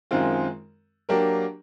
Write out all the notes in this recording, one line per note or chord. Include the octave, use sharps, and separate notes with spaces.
F#2 D#3 G#3 C4 F4
F#3 A#3 D4 G4 A#4